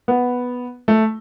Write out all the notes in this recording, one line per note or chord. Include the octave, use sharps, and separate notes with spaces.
B3
A3